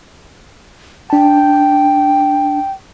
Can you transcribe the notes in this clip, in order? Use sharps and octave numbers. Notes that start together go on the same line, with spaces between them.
D4 G5 A5